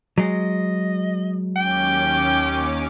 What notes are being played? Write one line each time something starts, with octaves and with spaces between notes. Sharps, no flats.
F#3 G#3 D#5
D#2 C#4 G5 D6